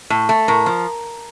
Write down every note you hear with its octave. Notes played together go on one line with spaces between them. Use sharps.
A2
A3
A2 A#4
F3